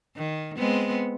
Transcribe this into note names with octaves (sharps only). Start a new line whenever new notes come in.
D#3
G#3 B3 C4